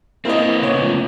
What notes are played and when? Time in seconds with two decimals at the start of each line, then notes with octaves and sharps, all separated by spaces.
0.25 A#3 C4 E4 B4 D#5
0.61 C#3 A3 B3 C#5
0.81 F3